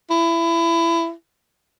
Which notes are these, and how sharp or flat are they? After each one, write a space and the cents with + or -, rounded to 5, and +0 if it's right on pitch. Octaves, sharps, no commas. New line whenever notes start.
E4 +20